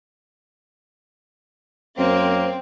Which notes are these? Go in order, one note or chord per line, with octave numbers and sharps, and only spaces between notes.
F#2 A#3 C4